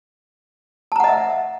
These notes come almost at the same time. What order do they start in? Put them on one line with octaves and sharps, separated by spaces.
A5 A#5 F#5 D#5 E5